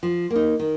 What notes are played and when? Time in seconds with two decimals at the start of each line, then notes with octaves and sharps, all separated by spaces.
0.03 F3
0.31 A#3 D#4
0.60 D#3